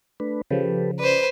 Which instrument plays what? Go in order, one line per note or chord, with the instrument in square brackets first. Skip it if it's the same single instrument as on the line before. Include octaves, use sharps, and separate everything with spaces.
[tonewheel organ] A3 D4 B4
[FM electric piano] C#3 F3 [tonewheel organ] G4 A4 B4
[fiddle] B4 C5 [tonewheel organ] D5